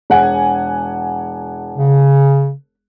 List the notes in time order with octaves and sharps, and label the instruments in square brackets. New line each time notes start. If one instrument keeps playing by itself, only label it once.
[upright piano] E1 F#5 G#5
[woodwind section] C#3